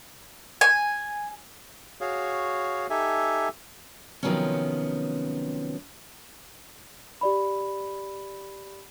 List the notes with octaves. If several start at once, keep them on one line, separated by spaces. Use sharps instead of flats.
G#5
F#4 G#4 C#5 F5
D#4 G4 A4 E5 G#5
C3 D#3 F3 F#3 B3 C#4
G4 D5 B5